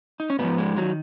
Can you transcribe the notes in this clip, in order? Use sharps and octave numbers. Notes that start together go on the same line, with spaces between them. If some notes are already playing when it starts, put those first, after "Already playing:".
D#4
C#4
G#2 F3 B3
G#3
D#3 F#3